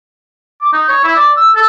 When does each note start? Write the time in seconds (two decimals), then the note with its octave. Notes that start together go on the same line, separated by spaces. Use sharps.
0.61 D6
0.73 D#4
0.89 C#5
1.04 E4
1.16 D5
1.37 E6
1.55 A4